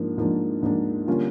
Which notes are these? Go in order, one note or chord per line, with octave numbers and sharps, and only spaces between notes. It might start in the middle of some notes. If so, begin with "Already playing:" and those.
Already playing: G#2 F3 A#3 D4
G#2 F3 A#3 D4
G#2 F3 A#3 D4
D3 G3 A#3 C#4 F4